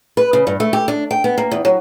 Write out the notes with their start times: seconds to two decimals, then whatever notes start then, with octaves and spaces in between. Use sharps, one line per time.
0.17 B4
0.33 C#3
0.47 G2
0.60 A3
0.73 G4
0.88 D4
1.11 G5
1.24 B3
1.38 A#3
1.51 E2
1.65 F#3